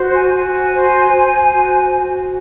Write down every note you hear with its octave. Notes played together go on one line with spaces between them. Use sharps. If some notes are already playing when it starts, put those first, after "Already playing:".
Already playing: F#4 C5
G#5
F#4 G#5
C5
C5
F#4
F#4